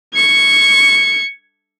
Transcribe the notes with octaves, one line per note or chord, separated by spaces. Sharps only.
G#6 C#7